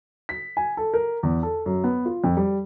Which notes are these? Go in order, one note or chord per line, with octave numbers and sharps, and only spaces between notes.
B6
G#5
A4
A#4
E2
A4
F#2
B3
F4
F2
G3